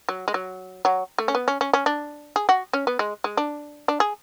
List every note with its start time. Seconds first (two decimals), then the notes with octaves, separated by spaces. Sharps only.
0.09 F#3
0.28 G#3
0.34 F#3
0.85 F#3
1.18 A3
1.28 C#4
1.35 B3
1.48 C#4
1.61 C#4
1.73 C#4
1.86 D4
2.36 G#4
2.49 F#4
2.73 C#4
2.87 B3
2.99 G#3
3.24 G#3
3.37 D4
3.88 D4
4.00 G#4